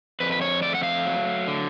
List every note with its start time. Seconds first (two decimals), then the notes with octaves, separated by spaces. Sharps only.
0.20 F2 B4
0.32 B4
0.41 C#5
0.62 A3 D5
0.75 F#5
0.83 F5
1.05 F#3
1.48 D3